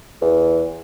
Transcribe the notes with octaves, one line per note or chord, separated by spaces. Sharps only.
E2